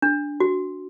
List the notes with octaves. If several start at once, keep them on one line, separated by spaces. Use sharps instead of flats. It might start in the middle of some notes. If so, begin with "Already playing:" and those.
D4
F#4